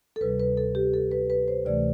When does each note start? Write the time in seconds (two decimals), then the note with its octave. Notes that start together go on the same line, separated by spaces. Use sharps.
0.16 A4
0.21 D2 C3 G3 B4
0.40 B4
0.57 A4
0.75 G4
0.94 A4
1.11 B4
1.30 B4
1.48 C5
1.66 D2 C3 E3 A3 D5